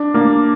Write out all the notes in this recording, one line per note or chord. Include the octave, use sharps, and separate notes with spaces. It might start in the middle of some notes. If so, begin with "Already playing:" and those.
Already playing: D4
A#3